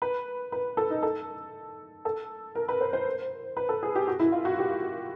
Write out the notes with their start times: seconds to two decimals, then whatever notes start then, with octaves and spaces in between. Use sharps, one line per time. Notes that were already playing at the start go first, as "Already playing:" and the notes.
0.02 B4
0.52 B4
0.77 A4
0.90 D#4
1.03 A4
2.05 A4
2.55 A#4
2.69 B4
2.81 C5
2.93 C5
3.57 B4
3.69 A4
3.83 G#4
3.95 G4
4.07 F#4
4.20 E4
4.32 F4
4.45 F#4
4.59 G4